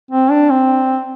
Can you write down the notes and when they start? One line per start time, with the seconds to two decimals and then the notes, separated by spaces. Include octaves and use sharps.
0.11 C4
0.31 D4
0.50 C4